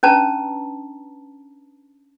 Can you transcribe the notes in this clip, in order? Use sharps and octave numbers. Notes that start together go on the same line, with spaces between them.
C#4 D4 B4 A5 A#5